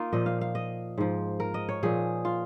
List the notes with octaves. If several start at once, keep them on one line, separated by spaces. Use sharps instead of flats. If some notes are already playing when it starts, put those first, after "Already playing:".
Already playing: A#3 D#4 F4
A#2 F3 D#5
F5
F5
D#5
G#2 F3
A#4
D#5
C#5
A#2 F3 G#4
F4